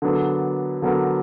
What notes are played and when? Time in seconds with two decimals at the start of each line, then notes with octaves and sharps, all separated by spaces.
0.02 D3 F#3 B3 D4 A#4
0.82 D3 F#3 B3 D4 A#4